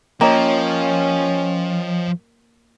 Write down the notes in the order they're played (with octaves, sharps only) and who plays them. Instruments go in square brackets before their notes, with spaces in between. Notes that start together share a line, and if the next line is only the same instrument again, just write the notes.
[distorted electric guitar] F3 [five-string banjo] A#3 [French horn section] C#4 [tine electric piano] C#5 D#5 G5